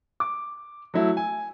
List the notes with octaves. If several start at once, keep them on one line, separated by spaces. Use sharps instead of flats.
D6
F#3 A3 E4
G#5